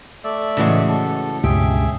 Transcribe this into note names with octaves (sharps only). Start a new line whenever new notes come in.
A3 D5 E5
A2 C#3 E3 G#3 F#4
A4
C#2 G2 B2 G4 G#4 E5